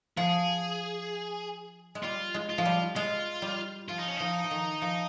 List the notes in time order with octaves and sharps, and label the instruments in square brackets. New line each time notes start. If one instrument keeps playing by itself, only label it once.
[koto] F3 [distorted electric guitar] G#4
[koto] G#3
[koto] G3 [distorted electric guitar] F4
[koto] G#3
[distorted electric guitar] F4
[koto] F3
G3
[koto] G#3 [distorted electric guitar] F4
[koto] G3
[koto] F3 [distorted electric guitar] F4
[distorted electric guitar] D#4
C#4
[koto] F3 [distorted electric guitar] D#4
[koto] F3
D#3
F3